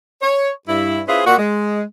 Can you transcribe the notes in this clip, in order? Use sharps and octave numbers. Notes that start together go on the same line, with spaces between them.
C#5
G2 E4
C#4 E4 F4 G#4 B4 C5
A#2 F#4
G#3